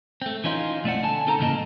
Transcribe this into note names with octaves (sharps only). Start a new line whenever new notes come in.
A3 C4
E3 C#4 D#4 F4
B1 A3 C4 D5 F#5
D3 G#5 A5
C4 D#4 A4 C5 A#5
G#2 C#3 E3 A#3 D#5 A5